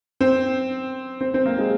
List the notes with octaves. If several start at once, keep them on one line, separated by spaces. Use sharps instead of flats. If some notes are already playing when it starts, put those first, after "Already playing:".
C4
C4
C4
A#3
G#3